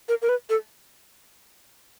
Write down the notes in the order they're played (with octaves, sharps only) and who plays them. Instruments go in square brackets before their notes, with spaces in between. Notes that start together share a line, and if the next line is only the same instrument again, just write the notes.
[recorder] A#4
A#4
B4
A4